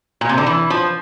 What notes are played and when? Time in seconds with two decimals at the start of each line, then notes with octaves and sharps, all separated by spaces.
0.21 A#2
0.29 C3
0.38 D3
0.46 E3
0.70 F3